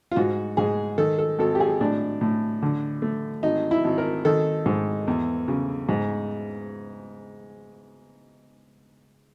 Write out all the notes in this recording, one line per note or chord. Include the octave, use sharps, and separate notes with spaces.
F4
G#2 F#4
G#2 G#4
D#3 A4
A4
G#1 A4
G4
G#4
A2 D4
A2
D3
A3
G#1 D#4
E4
G#1
A#4
D#3 A4
G#2
E2
C#3
G#2